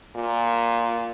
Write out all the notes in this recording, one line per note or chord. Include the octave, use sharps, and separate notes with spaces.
A#2